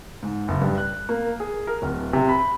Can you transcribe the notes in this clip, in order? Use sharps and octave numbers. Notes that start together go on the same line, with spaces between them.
G#2
F#1
G2
F#6
A#3
G#4
A#4
D1
C3
B5